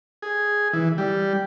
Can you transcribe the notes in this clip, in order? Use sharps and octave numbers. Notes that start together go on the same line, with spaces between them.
G#4
E3
G3